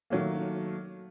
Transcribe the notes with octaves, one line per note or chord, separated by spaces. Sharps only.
D#3 F#3 A3 A#3